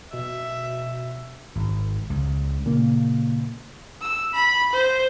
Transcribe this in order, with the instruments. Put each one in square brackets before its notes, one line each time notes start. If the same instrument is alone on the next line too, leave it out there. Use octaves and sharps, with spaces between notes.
[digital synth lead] B2 [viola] E5
[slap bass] G#1
C#2
[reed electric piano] A#2 C#3 A#3
[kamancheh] E6
B5
C5